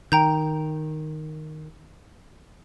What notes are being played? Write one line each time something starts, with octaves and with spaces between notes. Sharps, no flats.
D#3 G5 A#5 G6